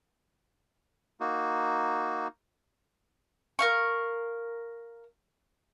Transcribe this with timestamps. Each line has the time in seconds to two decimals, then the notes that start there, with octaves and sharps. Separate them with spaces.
1.20 A#3 D#4 F#4
3.59 A#4 F5 C#6